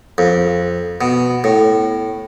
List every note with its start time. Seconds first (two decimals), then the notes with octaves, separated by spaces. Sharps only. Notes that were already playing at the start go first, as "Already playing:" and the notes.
0.18 F2
1.01 B2
1.44 A2